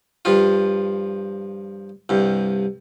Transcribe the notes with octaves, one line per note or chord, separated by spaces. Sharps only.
G2 F3 F4
C2 G2